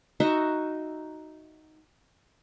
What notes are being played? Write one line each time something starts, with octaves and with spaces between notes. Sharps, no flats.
D#4 F#4 D#5 E5